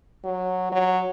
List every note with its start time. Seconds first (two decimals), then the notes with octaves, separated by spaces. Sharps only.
0.24 F#3
0.72 F#3